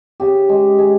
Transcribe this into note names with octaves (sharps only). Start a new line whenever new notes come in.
C#3 G4
G#3
G#3